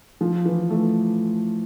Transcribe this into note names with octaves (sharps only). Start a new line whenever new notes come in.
F3
E3
A3